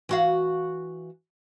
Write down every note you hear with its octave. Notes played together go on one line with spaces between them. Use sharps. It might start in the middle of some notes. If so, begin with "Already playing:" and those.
E3 F#4 F5